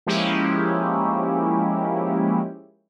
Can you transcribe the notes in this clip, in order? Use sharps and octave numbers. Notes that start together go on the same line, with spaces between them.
F3 G#3 A#3 C#4 E4 G4